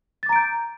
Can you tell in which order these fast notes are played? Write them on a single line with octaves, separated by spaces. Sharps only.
A6 D6 A#5 D7 G6